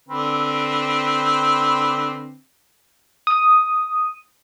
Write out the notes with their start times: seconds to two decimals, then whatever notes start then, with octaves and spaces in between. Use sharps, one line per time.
0.09 D3 C4 B4
3.27 D#6